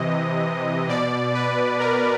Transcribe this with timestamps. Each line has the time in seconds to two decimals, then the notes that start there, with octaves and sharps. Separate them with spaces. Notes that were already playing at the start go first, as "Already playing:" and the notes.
Already playing: C3 E3 D#5
0.88 B2 D5
1.34 B4
1.79 A#4